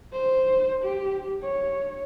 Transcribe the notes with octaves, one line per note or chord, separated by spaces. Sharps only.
C5
G4
C#5